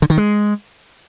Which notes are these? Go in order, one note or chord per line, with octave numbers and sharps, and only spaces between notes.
D3
D#3
G#3